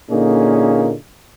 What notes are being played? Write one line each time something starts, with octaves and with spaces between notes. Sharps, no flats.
A#2 D3 A#3 C#4 D#4 G#4